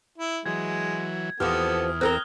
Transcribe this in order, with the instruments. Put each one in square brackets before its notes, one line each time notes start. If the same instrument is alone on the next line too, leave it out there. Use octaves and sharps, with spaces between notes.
[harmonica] E4
[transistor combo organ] E3 F#3 [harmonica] G#3 [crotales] G#6
[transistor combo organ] E2 [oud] F3 C4 G4 [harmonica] B3 A4 [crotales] D#6 F6
[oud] C4 A4 A#4 [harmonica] A#5 [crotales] F#6 G7